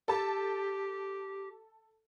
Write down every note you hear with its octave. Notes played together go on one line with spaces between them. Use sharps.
G4 A4 A5